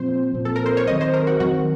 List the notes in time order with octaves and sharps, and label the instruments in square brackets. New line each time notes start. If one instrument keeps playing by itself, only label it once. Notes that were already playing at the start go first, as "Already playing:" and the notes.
Already playing: [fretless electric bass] A#2 F3 C4 [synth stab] C5
[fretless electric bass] A#2 F3 C4
[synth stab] A4
A#4
C5
C#5
[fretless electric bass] D#3 F#3 C4 [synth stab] D#5
[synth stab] C5
A#4
F#4
[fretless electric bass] D#3 F#3 C4 [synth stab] F#4